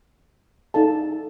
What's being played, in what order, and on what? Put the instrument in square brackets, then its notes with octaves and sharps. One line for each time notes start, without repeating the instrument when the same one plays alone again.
[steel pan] D#4 A4 D5 F5 A5